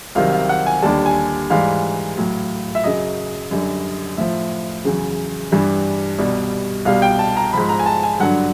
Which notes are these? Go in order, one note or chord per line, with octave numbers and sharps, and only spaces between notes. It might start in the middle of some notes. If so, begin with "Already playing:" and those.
C2 C3 D#3 F#3 F5
F5
F#5
G#5
D#2 D3 G3 A5
G#5
G#2 E3 G3 F5
A2 F#3
E5
F#2 C#3 F#3 D#5
F#2 D3 G3
A2 F3 E5
E2 C#3 F#3
G2 E3 G3
C2 B2 G3
C2 B2 G3 F5
G5
A5
A#5
G#2 F3 B5
A#5
G#5
A5
G#5
G2 D3 F#3 F#5